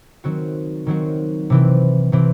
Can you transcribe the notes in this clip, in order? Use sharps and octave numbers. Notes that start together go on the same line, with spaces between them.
D#3 F#3 C4 F#4
D#3 F#3 C4 F#4
C3 E3 C4
C3 E3 C4